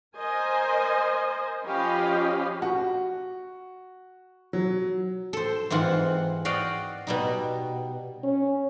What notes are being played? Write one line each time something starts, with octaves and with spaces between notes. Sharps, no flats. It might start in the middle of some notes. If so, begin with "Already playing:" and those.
A#4 C5 D#5 G#5
F3 C#4 G4 D#5 F5 B5
F#4
F#3
A4 C5
G#2 E3 C4 F4 F#5
F#4 D5 D#5 F5 G5
B2 G3 D#4
C#4